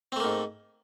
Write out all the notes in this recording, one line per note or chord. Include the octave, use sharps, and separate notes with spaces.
G#2 A3 A#3 C4